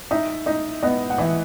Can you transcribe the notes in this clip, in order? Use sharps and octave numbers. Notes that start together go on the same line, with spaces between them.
D#4 E5
D#4 D#5
B3 D#5
F#5
E3 E5